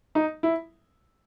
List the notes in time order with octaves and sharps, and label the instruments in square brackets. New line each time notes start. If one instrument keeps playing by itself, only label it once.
[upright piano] D#4
E4